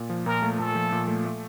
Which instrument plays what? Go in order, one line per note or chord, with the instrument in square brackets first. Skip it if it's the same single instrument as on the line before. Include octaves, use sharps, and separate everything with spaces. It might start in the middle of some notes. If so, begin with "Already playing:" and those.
Already playing: [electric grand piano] A#2
F3
[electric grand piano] A#2 [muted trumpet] A#4
[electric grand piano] A3
[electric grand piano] A#2 [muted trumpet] A4
[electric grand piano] F3
A#2
A3
A3